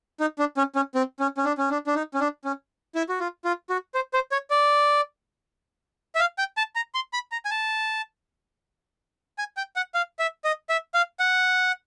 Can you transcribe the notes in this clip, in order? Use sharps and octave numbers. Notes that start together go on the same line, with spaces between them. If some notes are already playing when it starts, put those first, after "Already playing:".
D#4
D4
C#4
C#4
C4
C#4
C#4
D4
C#4
D4
D4
D#4
C#4
D4
C#4
E4
F#4
F4
F4
F#4
C5
C5
C#5
D5
E5
F5
G5
A5
A#5
C6
B5
A#5
G#5
A5
G#5
G5
F#5
F5
E5
D#5
E5
F5
F#5